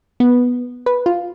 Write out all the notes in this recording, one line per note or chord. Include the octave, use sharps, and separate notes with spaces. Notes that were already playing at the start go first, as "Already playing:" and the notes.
B3
B4
F4